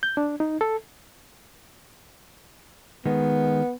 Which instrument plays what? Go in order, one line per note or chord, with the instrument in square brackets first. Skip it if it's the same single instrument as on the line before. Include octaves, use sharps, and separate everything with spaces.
[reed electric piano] G6
D4
D#4
A4
[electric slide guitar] D#3 G#3 [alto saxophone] B3